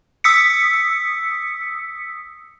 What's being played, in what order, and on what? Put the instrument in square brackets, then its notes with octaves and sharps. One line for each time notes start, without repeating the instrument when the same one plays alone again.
[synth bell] D#6 E6 B6 C#7